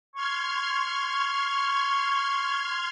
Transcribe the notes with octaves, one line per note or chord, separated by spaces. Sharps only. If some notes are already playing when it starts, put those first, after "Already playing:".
C6 C#6 F6 G#6